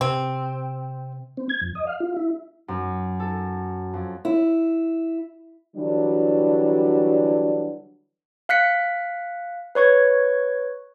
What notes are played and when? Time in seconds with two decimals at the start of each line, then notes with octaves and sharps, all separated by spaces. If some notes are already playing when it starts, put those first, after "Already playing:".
0.01 C3 C4
1.37 C4
1.49 G#6
1.61 F2
1.75 D#5
1.87 F5
2.00 F4
2.16 E4
2.68 F#2
3.20 A4
3.94 F2
4.25 E4
5.77 D3 E3 F#3 G3 D4 F#4
8.49 F5 F#6 B6 C#7
9.75 B4 C#5 C#6 G#6